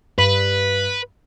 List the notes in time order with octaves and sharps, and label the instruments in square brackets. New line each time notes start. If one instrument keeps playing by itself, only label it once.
[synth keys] G2 [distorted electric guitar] B4